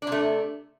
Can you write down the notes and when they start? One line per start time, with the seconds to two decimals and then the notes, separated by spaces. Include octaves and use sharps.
0.02 D4
0.07 C3
0.12 A3